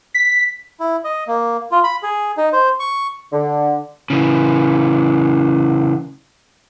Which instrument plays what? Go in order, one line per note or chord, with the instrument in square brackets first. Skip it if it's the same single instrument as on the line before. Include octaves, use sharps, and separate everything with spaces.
[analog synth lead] B6
[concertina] E4
D#5
A#3
F4
B5
G#4
D#4
C5
C#6
[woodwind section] D3
[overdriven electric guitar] C#3 E3